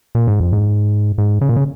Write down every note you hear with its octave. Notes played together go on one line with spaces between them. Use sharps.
A#2
G#2
F2
G#2
G#2
C#3
A#2
C#3